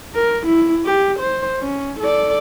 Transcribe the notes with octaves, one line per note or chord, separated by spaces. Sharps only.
A#4
E4
G4
C5
C#4
A4 D5